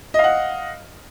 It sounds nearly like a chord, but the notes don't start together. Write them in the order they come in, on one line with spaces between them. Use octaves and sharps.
D#5 F5 F#5